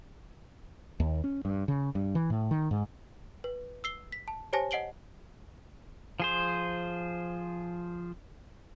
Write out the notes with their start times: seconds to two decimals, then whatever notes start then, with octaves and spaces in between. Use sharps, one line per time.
1.00 D#2
1.24 C#4
1.45 G2
1.68 C#3
1.95 G2
2.15 E3
2.30 A2
2.51 D#3
2.71 G#2
3.44 B4
3.84 E6 C7 G7
4.12 B6
4.28 A5
4.53 G4 C5 C#5 G#5 A5 A#6
4.71 D#5 F#5 C7 D7 F#7 G7
6.20 F3 G#4 C5